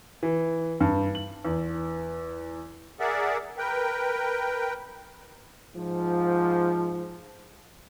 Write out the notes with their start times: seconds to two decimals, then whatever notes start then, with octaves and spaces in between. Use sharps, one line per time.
0.23 E3
0.80 G2
1.15 F#7
1.45 E2
3.00 G#4 A#4 D5 E5 F#5
3.58 A#4 B4 G5
5.74 G#2 F3